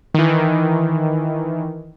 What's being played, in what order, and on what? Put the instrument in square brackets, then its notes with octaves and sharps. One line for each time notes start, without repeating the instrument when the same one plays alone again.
[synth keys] D#3 E3